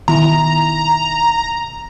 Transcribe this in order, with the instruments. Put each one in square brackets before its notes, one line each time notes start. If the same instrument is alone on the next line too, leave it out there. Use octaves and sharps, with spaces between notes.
[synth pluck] B2 D#3 E4 [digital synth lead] A#5